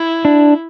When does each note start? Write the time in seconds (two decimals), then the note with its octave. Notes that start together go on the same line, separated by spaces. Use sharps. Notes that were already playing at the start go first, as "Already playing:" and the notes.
Already playing: E4
0.25 D4